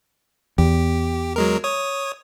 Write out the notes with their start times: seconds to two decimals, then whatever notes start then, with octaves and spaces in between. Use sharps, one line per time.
0.58 E2 G4
1.36 F#3 G#3 A#4
1.64 C#5 D#6